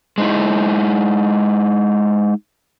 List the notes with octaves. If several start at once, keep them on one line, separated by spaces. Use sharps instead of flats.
G#3 D#4 E4